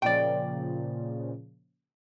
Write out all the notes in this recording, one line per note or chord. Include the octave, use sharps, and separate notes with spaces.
A#2 C#3 F3 D5 G5